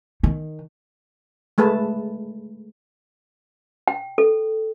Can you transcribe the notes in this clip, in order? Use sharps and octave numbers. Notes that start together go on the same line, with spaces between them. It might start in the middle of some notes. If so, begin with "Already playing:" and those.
D#3
G#3 A3 G#4 B4 A5
G5
A4